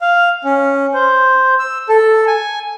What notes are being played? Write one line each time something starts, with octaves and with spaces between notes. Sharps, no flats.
F5
C#4
C5
E6
A4
G#5